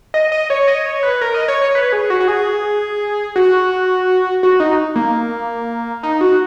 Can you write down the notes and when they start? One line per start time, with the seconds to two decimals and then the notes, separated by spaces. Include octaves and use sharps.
0.14 D#5
0.32 D#5
0.50 C#5
0.68 D#5
0.86 C#5
1.03 B4
1.21 A#4
1.35 D#5
1.48 C#5
1.62 C#5
1.75 B4
1.92 G#4
2.10 F#4
2.20 F#4
2.28 G#4
3.36 F#4
4.43 F#4
4.60 D#4
4.96 A#3
6.03 D#4
6.21 F#4